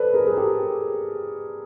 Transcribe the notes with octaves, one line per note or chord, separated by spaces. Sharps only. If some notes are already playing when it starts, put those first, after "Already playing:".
Already playing: A4 B4 C5 D5
G#4 A#4
G#4
G4 A4